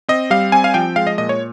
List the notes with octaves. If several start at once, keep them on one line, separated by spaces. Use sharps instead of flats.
C4 D#5
G3 F5
C4 G#5
F5
F3 G5
G#3 F5
D#5
A#2 D#5
C#5